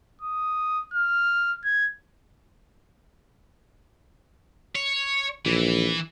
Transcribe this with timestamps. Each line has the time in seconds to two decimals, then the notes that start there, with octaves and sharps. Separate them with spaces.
0.21 D#6
0.94 F6
1.64 G#6
4.75 C#5
5.45 A#1 E3